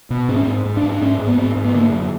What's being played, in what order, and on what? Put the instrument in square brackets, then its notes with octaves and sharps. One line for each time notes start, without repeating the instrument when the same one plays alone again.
[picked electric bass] B2
G#2 C4
C#4
C4
G#2
G#2
D4
G#2
D4
G#2 C#4
G#2
B3
G#2 C4
G#2
B3
D3 A#3
F#2